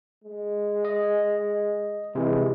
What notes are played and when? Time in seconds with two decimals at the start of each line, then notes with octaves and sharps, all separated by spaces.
0.24 G#3
0.85 D#5
2.15 C3 E3 G#3